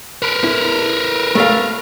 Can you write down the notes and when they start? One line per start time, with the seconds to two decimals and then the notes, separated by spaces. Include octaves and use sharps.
0.22 A#4 B4
0.44 E4
1.35 A3 A4 F5